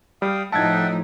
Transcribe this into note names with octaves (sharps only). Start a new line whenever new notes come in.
G3 F5 G5 D#6
A2 F3 D#4 E5 F#5 G5 A5 G#6